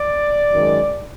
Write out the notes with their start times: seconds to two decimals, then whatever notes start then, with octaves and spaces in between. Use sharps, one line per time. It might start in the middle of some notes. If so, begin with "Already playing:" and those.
Already playing: D5
0.52 F#2 D#3 G#3